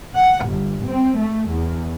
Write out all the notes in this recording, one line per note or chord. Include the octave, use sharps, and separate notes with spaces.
F#5
G1
C4
A3
E2